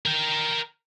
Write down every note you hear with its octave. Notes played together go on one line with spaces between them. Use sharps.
A#4 G5